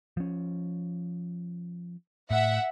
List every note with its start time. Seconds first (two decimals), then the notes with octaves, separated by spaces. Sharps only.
0.17 F3 C#4
2.31 A2 E5 F#5